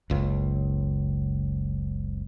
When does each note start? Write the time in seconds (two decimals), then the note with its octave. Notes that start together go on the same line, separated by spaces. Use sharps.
0.10 F#1 C#2